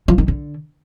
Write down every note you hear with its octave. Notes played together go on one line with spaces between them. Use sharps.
F3
D#3
D3